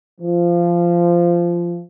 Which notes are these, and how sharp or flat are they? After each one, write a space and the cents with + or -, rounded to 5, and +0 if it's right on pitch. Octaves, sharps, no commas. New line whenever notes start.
F3 -15